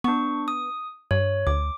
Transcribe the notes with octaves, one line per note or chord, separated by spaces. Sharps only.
B3 D4 C#6
D#6
G2 C#5
D2 D6